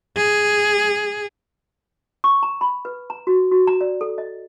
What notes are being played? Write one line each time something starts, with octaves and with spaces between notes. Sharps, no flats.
G#4
C#6
A#5
B5
B4
A#5
F#4
F#4
A#5
D5
A4
D#5